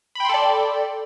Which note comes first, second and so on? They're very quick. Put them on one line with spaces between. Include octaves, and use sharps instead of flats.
B5 G5 C6 A4 D5